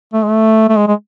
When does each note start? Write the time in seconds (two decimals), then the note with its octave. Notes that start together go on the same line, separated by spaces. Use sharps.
0.13 A3
0.23 G#3
0.28 A3
0.69 A3
0.76 G#3
0.87 G#3